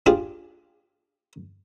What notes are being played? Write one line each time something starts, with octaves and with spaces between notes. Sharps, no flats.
D4 F4 G4 G#4